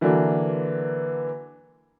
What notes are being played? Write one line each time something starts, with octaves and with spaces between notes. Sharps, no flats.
D3 E3 F#3 A#3 D4